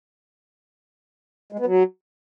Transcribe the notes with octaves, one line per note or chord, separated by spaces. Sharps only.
G#3
B3
F#3